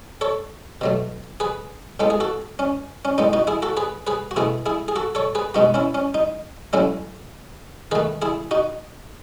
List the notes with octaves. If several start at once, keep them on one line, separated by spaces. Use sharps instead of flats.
A4 C#5
B2 F#3 A3
G#4 B4
A2 G#3 B3 A4
G#4
F#4 A4
C#4
C#4
A2 G#3 B3 D#4
D#4 F#4
E4 G#4
F#4 A4
G#4 B4
G#4 B4
F#4
B2 A3 E4 G#4
E4 G#4
G#4
F#4 A4
A4 C#5
G#4 B4
B2 G#3 B3 D#4 F#4
C#4 E4
C#4
D#4
A2 F#3 A3 C#4 E4
D#3 A3 G#4 B4
E4 G#4
D#4 F#4